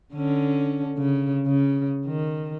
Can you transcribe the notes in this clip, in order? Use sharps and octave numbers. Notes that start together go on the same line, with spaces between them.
D3 C#4
C#3
C#3
D#3